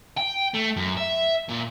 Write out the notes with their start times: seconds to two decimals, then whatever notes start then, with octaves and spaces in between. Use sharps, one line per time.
0.17 G5
0.54 A3
0.77 F#2
0.98 E5
1.49 A#2